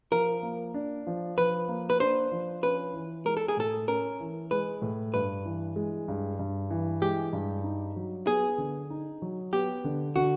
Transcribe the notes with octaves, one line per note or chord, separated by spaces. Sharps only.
F3 A#4
A#3
D4
F3
F3 B4
A#3
B4
D4 C5
F3
C#4 B4
E3
G#3 A#4
A4
G#4
A2 A4
C#4 A#4
E3
G#3 B4
A2
G2 B4
E3
G#3
G2
G2
E3
G#3 G4
G2
D#4
F#3
B3 G#4
D3
D#4
F#3
B3 G4
D3
D3 F#4